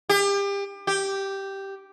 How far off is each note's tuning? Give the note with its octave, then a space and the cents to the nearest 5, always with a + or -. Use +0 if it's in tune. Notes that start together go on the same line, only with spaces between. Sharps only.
G4 +30
G4 -5